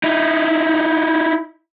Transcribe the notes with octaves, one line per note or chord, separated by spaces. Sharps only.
D#4 E4